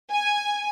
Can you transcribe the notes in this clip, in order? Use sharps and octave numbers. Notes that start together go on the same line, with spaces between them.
G#5